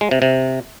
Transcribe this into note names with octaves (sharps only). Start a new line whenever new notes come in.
G#3
C3
C3